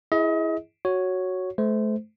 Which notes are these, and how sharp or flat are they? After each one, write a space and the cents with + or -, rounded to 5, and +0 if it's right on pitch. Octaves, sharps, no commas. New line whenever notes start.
E4 +0 G#4 +0 D#5 +35
F#4 +0 C#5 +0
A3 -35 C5 -25